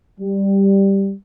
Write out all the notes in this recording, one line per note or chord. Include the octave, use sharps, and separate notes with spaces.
G3